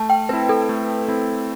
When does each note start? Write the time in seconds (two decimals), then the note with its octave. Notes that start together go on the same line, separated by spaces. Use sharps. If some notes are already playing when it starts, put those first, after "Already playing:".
Already playing: A3 A5
0.10 G5
0.29 C4 E4 B4
0.49 A4
0.69 A3
1.08 C4 E4